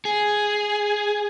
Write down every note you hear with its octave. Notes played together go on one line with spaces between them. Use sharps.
G#4